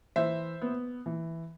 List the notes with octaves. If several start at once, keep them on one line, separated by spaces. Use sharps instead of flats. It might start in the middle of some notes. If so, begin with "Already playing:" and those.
E3 C5 E5
B3
E3